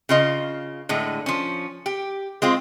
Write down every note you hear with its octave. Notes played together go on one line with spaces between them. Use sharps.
C#3 F4 D#5
A2 D3 G#3
F3 C#4
G4
G#3 C4 F4